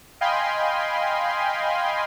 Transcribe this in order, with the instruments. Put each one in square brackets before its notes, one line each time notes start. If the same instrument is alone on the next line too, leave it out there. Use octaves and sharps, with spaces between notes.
[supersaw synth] D#5 F5 G5 G#5 B5 C6